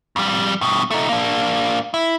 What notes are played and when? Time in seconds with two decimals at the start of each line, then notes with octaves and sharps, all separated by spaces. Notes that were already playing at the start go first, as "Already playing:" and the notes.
0.16 F2 G3
0.61 G2 B2
0.91 A3 D#4
1.09 A#3 D4
1.94 E4